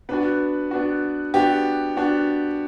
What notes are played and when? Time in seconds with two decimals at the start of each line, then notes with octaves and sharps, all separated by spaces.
0.09 B3 D4 F#4 B4
0.71 B3 D4 F#4
1.34 B3 D4 F#4 G4
1.97 B3 D4 F#4